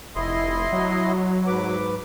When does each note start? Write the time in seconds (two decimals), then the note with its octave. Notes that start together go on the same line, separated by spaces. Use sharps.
0.16 F1 E4 D#5 C6
0.72 F#3
1.47 G#2 B4 D6